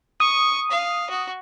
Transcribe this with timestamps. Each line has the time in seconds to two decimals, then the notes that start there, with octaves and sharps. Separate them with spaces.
0.20 C#6 D#6
0.71 F5
1.10 F#4